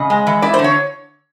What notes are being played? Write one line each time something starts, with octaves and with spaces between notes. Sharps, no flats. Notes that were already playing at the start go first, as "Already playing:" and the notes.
Already playing: C#3 D#5
G#3
E3
E4 D5
C5
D3
C#5